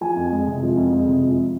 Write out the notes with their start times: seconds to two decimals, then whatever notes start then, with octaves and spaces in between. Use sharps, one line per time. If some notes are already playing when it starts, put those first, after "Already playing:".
0.01 F3 G#5
0.16 F2
0.32 G#3
0.47 C3
0.63 F3
0.77 F2
0.93 G#3
1.08 C3
1.23 F3